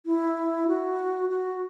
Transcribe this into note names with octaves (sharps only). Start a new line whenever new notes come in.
E4
F#4
F#4